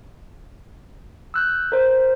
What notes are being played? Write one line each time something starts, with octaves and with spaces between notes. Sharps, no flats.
E6 F#6 G6
A#4 C5